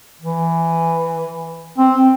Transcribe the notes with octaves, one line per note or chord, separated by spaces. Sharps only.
E3
C4